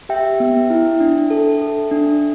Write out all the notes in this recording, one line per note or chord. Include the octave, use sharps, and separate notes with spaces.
G4 E5 G5
B3
E4
D4
A4
A4
D4